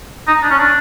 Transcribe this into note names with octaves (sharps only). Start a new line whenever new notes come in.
D#4
D4
C#4
D4